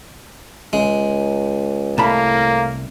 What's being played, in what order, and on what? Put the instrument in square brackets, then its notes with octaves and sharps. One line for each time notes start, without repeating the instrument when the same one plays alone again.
[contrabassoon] C#2 [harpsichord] G#3
[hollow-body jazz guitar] C2 A5 B5 [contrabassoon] A2 [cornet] A#3